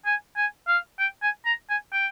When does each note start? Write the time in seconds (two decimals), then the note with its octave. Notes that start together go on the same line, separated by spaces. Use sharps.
0.06 G#5
0.37 G#5
0.68 F5
0.99 G5
1.23 G#5
1.46 A#5
1.69 G#5
1.93 G5